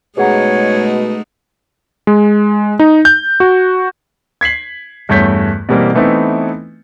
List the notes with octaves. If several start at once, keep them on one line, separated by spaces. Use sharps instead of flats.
B2 G#3 A3 D#4 G#4 C#5 F#5 A#5
G#3
D#4
G6
F#4
G#6 B6 C7 F#7
E2 G2 A3 C#5 G6 B6
B2 E3 G3 A#3 C4
E3 A3 B3 C4 D#4 E4